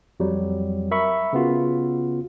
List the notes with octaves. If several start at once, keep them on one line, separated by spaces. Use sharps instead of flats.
F2 F#3 G3
A#4 E5 B5 C#6
C#3 B3 F4 F#4